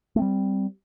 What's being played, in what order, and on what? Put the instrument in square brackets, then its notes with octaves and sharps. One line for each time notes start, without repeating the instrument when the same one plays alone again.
[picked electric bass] A3
C4
G3